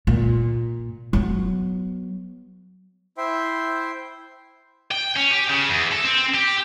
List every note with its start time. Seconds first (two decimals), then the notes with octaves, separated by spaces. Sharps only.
0.07 A#2
1.13 F#3 B3
3.18 E4 C5 E5 G5 C6
4.91 G5
5.16 C#4
5.31 G4
5.49 C#3
5.69 E2
5.92 A4
6.04 C4
6.35 G4